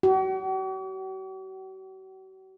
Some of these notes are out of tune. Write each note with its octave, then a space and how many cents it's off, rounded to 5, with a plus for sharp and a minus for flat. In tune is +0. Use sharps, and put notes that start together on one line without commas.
F#4 +45